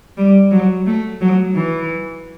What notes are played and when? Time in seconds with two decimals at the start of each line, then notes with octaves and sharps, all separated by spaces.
0.17 G3
0.51 F#3
0.87 A3
1.21 F#3
1.55 E3